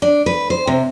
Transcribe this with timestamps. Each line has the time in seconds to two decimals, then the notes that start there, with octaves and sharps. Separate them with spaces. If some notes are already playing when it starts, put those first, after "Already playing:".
0.02 D4
0.26 B4
0.50 C5
0.67 C3